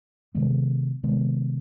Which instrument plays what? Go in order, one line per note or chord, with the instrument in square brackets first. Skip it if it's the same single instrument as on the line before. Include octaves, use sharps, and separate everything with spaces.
[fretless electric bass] C3 D#3 G#3 B3
C3 D#3 G#3 B3